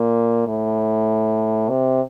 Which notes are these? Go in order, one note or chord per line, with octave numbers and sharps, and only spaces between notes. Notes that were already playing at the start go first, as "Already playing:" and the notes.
Already playing: A#2
A2
C3